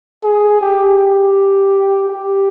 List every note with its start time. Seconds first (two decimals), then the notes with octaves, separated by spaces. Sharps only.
0.24 G#4
0.61 G4
0.98 G4
2.08 G4